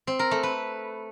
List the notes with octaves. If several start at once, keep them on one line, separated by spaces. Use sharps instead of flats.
C4
A#4
A3
B4